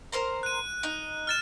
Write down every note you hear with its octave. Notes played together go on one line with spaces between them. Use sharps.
A#4 C5 A#5
F#6 D#7
D#4
F6 A6 E7